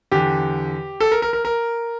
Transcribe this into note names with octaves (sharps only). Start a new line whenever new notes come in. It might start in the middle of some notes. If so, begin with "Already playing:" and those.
E2 D3 G4
A4
A#4
A#4
A#4
A#4